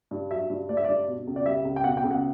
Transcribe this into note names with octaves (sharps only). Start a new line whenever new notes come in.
G2
F#3 E5
G2
A3 D5
E5
G2 D5
B2
C#2
D5
G3 E5
C#2
G5
B2 F#5
G5
C#2
F#5